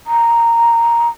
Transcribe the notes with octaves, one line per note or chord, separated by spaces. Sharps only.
A#5